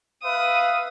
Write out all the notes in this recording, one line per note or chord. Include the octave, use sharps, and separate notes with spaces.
B4 E5 F5 D#6